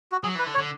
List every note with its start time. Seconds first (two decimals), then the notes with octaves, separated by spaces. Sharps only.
0.12 F#4
0.23 F#3 G#4
0.35 E3 B4
0.46 D3
0.55 C#5
0.58 D3